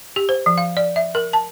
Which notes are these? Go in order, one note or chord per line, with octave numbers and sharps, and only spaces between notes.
G4
C5
F3
F5
D5
E5
A#4
A5